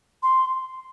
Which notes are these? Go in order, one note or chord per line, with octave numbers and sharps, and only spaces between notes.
C6